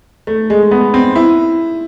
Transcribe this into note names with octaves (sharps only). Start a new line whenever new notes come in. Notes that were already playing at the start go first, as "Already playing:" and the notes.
A3
G#3
B3
C4
E4